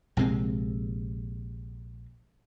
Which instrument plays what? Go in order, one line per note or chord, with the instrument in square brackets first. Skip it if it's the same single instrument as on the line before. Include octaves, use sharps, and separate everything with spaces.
[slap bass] A#1 C3 G#3 C4